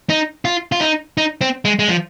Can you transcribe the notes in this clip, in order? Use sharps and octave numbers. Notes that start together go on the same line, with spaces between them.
D#4
F4
F4
D#4
D#4
C4
G#3
G#3
F3